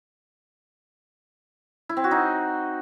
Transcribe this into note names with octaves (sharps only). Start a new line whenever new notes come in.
E4
C4
F#4
D#4